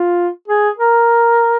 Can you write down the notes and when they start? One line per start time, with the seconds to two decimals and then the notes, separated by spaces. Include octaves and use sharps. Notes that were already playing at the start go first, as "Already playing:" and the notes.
Already playing: F4
0.48 G#4
0.78 A#4